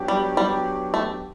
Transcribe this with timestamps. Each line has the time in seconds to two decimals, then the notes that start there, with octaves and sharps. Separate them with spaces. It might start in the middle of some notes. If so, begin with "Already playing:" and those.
Already playing: F#3 B3 D4 G4
0.08 G3
0.37 G3
0.94 A3